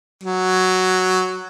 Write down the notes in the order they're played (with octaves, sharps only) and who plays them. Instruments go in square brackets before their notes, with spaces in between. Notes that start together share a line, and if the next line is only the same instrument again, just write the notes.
[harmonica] F#3